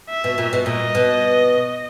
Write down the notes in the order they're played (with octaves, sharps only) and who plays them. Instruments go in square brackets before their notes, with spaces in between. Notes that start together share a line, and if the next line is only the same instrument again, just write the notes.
[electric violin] E5
[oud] B2
A#2
B2
[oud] A#2 [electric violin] D#5
[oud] B2